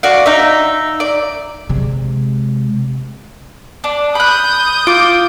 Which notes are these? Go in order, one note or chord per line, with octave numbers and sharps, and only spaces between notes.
F#4 D5 F5
D#4 E5
D5
C3 G#3
D4
B5 D#6 F#6 G6
F4 D6